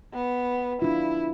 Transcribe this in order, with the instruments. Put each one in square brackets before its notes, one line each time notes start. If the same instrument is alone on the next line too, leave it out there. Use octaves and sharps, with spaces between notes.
[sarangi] B3
[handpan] D4 F4 [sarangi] E4